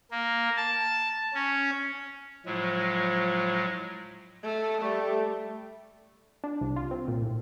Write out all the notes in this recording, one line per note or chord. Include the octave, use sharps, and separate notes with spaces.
A#3
A5
C#4
A2 F3 F#3 G#3
A3
G3 A3
D4
C2
F4
C4
A#2
A2